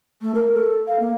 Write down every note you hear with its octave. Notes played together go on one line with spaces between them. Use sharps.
A3
A#4
A4
F5
A#3